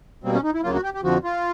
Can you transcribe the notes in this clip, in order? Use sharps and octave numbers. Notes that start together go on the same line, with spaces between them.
B2 G3 A#3 C4
C#4
D#4
E4
D2 C#3 F#3 A#3 F4
F#4
G4
G4
F2 D3 F3 F#4
F4